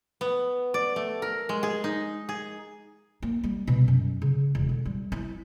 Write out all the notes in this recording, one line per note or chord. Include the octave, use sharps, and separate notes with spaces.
B3
D5
A3
A#4
G#3
G#4
D#4
G#4
A#3
G3
B2
F#2
C#3
E1
D3
G3
E4